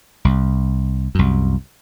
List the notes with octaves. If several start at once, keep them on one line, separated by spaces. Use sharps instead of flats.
C2
C2 F#2